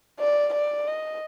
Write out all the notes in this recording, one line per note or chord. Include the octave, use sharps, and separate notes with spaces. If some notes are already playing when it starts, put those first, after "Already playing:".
D5
D5
D#5